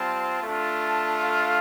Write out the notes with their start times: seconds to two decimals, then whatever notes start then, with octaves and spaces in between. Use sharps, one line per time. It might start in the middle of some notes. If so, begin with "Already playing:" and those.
Already playing: G3 C4 F4 A5
0.43 A3 D4 F4
0.83 A5
1.22 F5